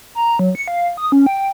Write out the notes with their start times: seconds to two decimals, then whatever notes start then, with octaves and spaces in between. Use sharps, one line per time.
0.15 A#5
0.39 F#3
0.55 C#7
0.68 F5
0.97 D#6
1.12 C#4
1.26 G5